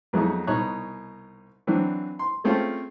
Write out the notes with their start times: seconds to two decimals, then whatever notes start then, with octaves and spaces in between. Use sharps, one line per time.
0.13 F2 F#3 G#3 B3 D#4 E4
0.47 C2 B2 D#4 C#5 F#6
1.67 E3 F#3 C4 D4
2.19 C6
2.44 G#3 A3 C4 C#4 F4